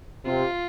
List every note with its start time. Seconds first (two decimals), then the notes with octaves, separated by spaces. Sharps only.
0.25 C3 F4